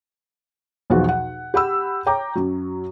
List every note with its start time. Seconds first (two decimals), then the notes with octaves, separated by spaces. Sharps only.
0.90 B1 E2 B2 F3 F#4 F#5
1.09 F#5
1.54 G4 F#5 B5 E6
2.06 C#5 G5 A#5 D6
2.35 F#2 F#3